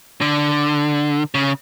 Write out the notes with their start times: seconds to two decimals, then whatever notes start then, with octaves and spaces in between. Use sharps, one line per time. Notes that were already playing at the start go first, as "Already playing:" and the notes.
0.21 D3
1.35 C#3